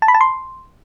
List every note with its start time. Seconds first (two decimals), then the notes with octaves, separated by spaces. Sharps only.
0.02 A5
0.08 B5
0.14 A5
0.21 C6